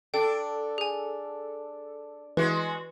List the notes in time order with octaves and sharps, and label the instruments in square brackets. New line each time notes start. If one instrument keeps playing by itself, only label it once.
[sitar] D4 [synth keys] A4 [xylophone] G5
[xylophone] G#4 G#5
[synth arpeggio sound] E3 [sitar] G#3 F#4 [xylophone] B4